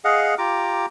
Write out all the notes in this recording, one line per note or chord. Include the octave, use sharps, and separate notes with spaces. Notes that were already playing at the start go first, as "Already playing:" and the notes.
G#4 D#5 F5 F#5
F4 G4 A#5 D6